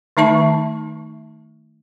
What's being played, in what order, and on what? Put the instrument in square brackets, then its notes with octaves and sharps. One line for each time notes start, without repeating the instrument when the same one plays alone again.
[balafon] D#3 A3 D#4 E5 A5 C#6